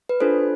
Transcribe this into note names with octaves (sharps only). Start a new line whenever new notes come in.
B4
D4 F4 A4 C5